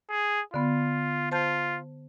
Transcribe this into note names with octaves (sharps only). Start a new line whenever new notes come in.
G#4
D3 B3 F4
F4 C5 A5 G6